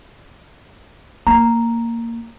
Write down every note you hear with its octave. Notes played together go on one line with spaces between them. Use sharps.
A#3 A#5